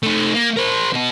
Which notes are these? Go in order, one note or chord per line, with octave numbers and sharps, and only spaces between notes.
A3 D#4
A#3
A#4 C5
B2 D#5